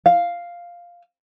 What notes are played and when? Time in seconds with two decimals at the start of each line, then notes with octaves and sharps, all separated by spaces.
0.06 F5